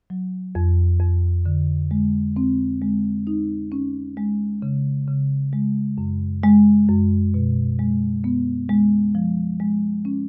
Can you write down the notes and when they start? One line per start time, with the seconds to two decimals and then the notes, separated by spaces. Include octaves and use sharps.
0.10 F#3
0.55 F2
1.00 F2
1.46 D3
1.91 G#3
2.36 C4
2.82 G#3
3.27 D#4
3.72 C#4
4.17 G#3
4.62 C#3
5.08 C#3
5.53 G#3
5.98 F#2
6.43 G#3
6.88 F#2
7.34 B2
7.79 G#3
8.24 B3
8.69 G#3
9.15 F3
9.60 G#3
10.05 C#4